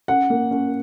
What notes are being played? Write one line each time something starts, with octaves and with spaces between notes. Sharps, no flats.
C#4 F#5
A#3
C#4